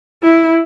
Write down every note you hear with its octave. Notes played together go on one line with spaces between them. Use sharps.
E4